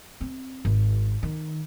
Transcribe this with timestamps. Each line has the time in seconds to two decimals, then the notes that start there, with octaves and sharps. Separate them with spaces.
0.21 C4
0.65 G#1
1.23 D#3